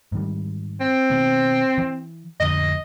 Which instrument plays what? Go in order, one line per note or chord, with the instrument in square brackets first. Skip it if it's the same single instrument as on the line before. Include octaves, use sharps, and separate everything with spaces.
[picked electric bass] G#2 D#3 G3
[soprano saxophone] C4
[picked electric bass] B2 D#3 B3
E3
[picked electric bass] A1 F2 D3 [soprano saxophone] D#5